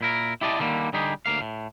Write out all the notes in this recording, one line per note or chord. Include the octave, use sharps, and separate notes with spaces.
A#2 E4 A#4
E4 G4 D5 D#5 A5
D3 D#3 G3 A3 A#3
D3 G3 D#4 G4 G#4
D2 A#3 F5
A2